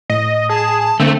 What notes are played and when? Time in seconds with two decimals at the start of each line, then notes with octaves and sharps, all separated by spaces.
0.10 A2 D#5
0.49 G#4 A5
1.00 D3 A3 A#3 C4